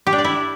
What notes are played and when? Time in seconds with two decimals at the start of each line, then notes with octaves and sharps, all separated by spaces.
0.07 G4
0.13 D4
0.19 D5
0.24 E4